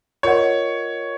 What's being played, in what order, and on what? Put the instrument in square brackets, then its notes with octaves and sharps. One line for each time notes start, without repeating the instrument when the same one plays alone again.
[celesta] F4 A#4 D#5 F#5 [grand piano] C#5